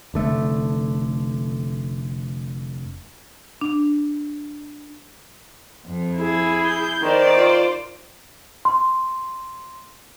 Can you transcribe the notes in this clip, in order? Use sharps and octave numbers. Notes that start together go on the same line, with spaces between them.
F1 D3 A3
D4
F2
E4 G#4
G6
D#3 C5 D5
F4
C6